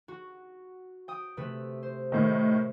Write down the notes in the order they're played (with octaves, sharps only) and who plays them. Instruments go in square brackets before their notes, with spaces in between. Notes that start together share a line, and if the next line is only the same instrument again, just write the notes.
[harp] F#4
G5 D#6
C3 A3 B4
C5
[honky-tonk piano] A2 D#3